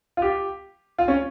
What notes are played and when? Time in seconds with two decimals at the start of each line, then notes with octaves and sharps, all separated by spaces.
0.17 F4
0.22 G4
0.98 F4
1.08 C#4